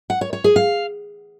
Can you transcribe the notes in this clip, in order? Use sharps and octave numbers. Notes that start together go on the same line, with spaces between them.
F#5
C#5
C#5
G#4
F5